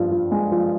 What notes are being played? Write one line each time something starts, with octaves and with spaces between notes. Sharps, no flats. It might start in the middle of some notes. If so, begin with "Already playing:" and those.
Already playing: G2 F3
F3
G#3
F3